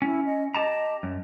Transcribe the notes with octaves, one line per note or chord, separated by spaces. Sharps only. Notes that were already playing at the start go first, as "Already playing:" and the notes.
C#4 E4
D#5
G4 D#5 A5 A#5
F#2